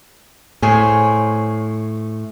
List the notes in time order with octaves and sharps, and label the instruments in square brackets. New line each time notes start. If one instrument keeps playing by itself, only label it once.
[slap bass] A2 [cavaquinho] G#4 C5 C#5